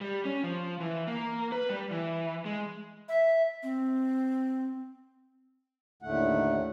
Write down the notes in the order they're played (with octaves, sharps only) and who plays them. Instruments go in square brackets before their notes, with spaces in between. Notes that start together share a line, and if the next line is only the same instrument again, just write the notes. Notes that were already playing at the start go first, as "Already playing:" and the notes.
[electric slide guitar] G3
C#4
F3
E3
A#3
B4
G3
E3
G#3
[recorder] E5
C4
[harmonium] D#2 A2 D3 A3 F#5